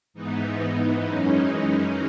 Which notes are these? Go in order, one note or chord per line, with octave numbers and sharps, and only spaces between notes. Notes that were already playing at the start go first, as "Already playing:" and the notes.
G#2 E3 B3 D#4
F#2 E3 G#3 C#4